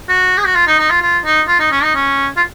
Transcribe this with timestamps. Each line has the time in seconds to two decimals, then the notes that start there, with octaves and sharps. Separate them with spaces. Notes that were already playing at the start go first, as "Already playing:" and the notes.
0.09 F#4
0.38 G#4
0.46 F#4
0.55 F4
0.67 D#4
0.79 D#4
0.90 F4
1.02 F4
1.25 D#4
1.48 F4
1.59 D#4
1.71 C#4
1.83 D#4
1.95 C#4
2.37 F4